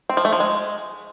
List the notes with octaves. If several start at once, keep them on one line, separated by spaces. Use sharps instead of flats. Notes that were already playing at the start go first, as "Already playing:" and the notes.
C4
F3
A3
F3
G#3